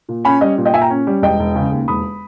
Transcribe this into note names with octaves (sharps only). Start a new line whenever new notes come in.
A#2
C#4 G#5 B5
G3 D#5
A#2
D#5 G5
A#2 E5 G#5
G5 A#5
C#4
G3
E1 D#5 G5
E1
C#3
D#2
E1 B5 D#6